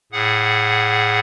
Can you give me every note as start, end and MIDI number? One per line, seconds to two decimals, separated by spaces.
0.13 1.19 45
0.13 1.19 68
0.13 1.19 78